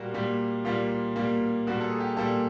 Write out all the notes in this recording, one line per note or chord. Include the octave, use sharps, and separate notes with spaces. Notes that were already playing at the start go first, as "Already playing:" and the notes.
Already playing: A#2 G3 A#3 F#4
A#2 G3 A#3
A#2 G3 A#3 F4
A#2 G3 A#3
A#2 G3 A#3 F#4
A4
G#4
G4
A#2 G3 A#3 A4